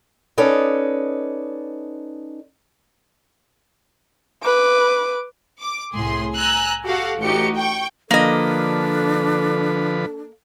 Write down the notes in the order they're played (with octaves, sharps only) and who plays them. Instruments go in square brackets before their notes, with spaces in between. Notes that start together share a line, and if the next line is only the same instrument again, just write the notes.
[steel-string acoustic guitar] C#4 D#4 A4 B4 D5 D#5
[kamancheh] B4 D6
[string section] D6
C2 A2 G#4 C6
G#5 A#5 E6 F#6
F#4 G4 A4 F5 F#5
A1 D#4 F#4 G4 C#7
G5 C#6
[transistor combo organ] D3 F3 B4 [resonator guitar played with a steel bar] A#3 D#5 [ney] D4 [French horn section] A4